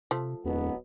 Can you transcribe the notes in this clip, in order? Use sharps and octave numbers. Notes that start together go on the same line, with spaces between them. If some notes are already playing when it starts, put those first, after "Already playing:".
C3 F3 A3
D1 E2 B2 F#3 B3